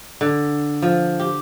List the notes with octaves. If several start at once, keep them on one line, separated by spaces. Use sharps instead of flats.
D3
F3
G4